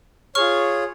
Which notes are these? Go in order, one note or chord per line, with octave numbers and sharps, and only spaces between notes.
F4 G#4 C#5 C#6 F6